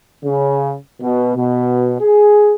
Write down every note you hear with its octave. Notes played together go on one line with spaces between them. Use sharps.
C#3
B2
B2
G#4